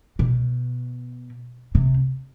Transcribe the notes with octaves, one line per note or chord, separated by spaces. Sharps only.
B2
C3